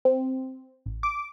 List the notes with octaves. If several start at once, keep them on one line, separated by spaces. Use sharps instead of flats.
C4
A1
D6